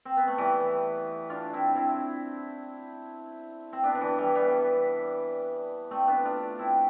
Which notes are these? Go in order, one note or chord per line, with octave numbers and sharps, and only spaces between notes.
C4
B3
A3
E3 G3
D4 F4
C4 E4
C4 E4
C4
B3 D4
D3
E3
E3 G3
G3 B3
A3 C4
B3 D4
D4 F4
C4 E4